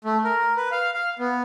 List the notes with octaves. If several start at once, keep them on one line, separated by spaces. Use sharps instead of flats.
A3
A#4
B4
F5
F5
B3